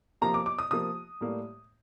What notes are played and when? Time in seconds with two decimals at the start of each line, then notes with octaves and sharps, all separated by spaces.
0.22 C3 F3 A#3 A#5
0.34 D6
0.46 D6
0.59 D#6
0.71 C3 F3 A#3 D#6
1.21 A2 G3 A#3